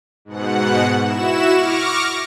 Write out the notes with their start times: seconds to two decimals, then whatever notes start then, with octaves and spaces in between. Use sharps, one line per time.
0.25 G#2 B2 F#5
1.02 E4 F#4 E7
1.52 C#6 D6 F6 A#6